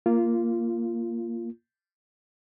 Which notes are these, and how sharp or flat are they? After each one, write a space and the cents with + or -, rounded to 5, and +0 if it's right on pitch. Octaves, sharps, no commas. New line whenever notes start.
A#3 +0 F4 -20